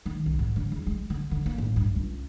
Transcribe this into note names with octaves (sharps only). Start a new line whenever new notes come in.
D#3
C2
G#2
D3
E2
G#3
D3
D3
A#3
A1
G2
C#2